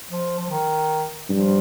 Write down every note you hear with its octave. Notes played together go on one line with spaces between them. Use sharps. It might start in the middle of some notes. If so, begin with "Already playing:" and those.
F3
F3
D#3
G2 F3